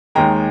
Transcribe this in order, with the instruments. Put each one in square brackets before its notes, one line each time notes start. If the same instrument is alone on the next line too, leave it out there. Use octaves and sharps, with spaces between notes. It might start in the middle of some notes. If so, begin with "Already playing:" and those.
[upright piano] D#2 D#3 G#3 G5 A#5